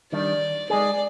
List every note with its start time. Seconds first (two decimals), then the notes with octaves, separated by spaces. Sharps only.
0.12 D#3 G3 D4 D5
0.70 G#3 D#4 G#4 D5